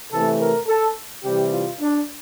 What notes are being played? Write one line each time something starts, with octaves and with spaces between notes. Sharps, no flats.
C3 E3 A3 A4
A#4
A4
C3 E3 G3 G4
F4
D4